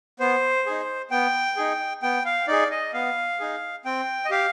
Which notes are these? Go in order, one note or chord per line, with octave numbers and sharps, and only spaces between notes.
B3 C5
D#4 G#4
B3 G5
D#4 G#4
B3 G5
F5
D#4 G#4 D5
D#5
B3 F5
D#4 G#4
C4 G5
D#5
G4 F5